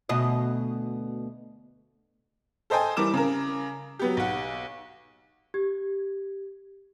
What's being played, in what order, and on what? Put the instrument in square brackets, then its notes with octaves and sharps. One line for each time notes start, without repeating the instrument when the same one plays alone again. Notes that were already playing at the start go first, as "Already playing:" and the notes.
[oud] D2 B2 D#5
[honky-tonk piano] A4 C5 D#5 G5 G#5
E3 G3 A#4 D6 E7
C#3 A#4
F#3 B3 G4
B1 F#5
[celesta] G4 G#6